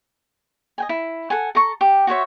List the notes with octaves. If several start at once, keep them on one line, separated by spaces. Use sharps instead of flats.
D#5 G5 G#5
E4
A4 F#5 G#5
A4 A#5 C#6
G4
F#4 C5 C#5 E5